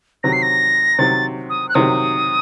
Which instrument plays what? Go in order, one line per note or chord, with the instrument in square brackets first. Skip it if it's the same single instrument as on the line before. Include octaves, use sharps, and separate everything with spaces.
[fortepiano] C3 D#3 F#3 C4 [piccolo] A#6
[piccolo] C7
A#6
[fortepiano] C3 D#3 F#3 C4 [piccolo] A6
[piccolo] D#6
F#6
[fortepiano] C3 D#3 F#3 C4 [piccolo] D#6